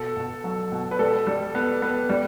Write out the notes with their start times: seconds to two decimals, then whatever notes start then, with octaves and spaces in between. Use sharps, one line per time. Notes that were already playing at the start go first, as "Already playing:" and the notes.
Already playing: B2 A4
0.17 B2
0.44 F#3
0.72 B2
0.91 B4
0.99 G3 A4
1.27 G3
1.55 B3
1.82 B3
2.09 G3